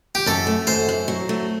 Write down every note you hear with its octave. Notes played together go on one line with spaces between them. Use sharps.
G4
F#2 A4
A3
F#2 C5
F#2
F#3
A3